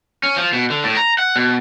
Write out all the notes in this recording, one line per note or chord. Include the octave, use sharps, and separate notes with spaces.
C#4
F3
B2
D3
A2
A#5
F#5
B2